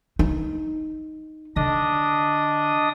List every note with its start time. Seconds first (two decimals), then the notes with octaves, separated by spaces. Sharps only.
0.19 D#4
1.56 D3 D4 D#5 D#6